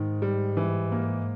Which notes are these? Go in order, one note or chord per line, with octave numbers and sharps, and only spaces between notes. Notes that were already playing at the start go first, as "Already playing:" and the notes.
Already playing: G#2 D#3
G3
E3
A#3